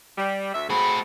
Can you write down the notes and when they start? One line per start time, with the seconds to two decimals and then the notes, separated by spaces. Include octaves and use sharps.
0.18 G3
0.54 D2 E5
0.69 A3 C4 F#4 G#4 B5